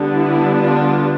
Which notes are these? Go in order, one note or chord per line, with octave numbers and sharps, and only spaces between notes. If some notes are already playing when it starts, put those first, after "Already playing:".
Already playing: D3 G3 B3 D4
E4
F4